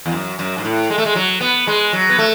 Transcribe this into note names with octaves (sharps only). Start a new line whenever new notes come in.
E2
F#2
F#2
G#2
A2
G#3
A3
G#3
F#3
B3
G#3
F#3
B3
A3